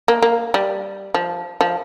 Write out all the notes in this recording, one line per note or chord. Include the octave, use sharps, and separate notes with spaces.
A#3
A#3
G3
F3
F3